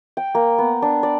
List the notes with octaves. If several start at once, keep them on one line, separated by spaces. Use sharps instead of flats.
G5
A#3
B3
D4
D5